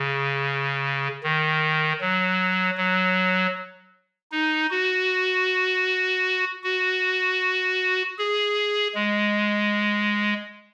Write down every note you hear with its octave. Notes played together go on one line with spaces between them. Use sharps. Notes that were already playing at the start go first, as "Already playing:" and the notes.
Already playing: C#3
D#3
F#3
F#3
D#4
F#4
F#4
G#4
G#3